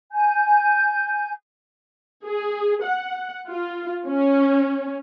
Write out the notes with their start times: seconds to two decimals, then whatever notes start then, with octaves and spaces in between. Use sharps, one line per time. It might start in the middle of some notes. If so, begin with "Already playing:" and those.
0.12 G#5 G6
2.25 G#4
2.84 F#5
3.48 F4
4.06 C#4